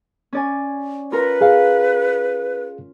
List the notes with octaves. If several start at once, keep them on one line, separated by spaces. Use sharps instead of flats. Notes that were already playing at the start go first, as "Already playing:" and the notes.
C#4 D5 G#5
F4 A#4 B4 A#5
G#4 F5